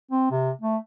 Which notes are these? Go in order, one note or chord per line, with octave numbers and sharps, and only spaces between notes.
C4
C3
A3